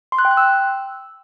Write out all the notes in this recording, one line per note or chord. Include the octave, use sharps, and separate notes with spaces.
C6
F#6
G5
F#6
E6